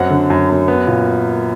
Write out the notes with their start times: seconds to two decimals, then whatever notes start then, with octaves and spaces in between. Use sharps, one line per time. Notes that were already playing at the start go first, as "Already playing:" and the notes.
Already playing: F#2 C4 F#5
0.10 D3
0.30 F#2
0.50 F#2
0.68 B3
0.87 A#2